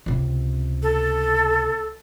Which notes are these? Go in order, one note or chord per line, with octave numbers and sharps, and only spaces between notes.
C#2 C3
A4